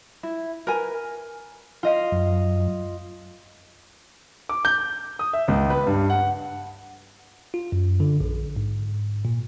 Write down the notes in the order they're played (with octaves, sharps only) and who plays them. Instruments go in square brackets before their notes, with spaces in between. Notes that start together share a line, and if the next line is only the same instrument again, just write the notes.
[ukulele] E4
A#4 B4 G#5
[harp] F4 D#5 F5
[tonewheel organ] F#2
[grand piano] D6
G6
D#6
E5
C#2
B4
G2
F#5
[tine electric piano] F4
F#2
D3
A#1
G#2
A#2